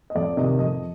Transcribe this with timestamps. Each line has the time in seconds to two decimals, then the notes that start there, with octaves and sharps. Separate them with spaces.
0.10 D#5
0.15 F2 D5
0.37 C3 D#3 D#5
0.59 F2 D#5